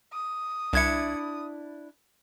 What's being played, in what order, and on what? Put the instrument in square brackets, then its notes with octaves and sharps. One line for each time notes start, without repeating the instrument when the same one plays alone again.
[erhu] D#6
[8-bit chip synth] C2 G#6 C#7 [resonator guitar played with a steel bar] D4 E4